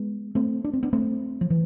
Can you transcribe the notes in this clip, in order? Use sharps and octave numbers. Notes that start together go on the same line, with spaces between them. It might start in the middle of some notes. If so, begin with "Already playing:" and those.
Already playing: G#3 B3
A3 C4
D4
C4
B3 D4
A3 C4
F3
E3